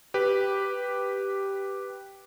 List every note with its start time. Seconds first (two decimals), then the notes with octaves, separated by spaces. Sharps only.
0.14 G4 B4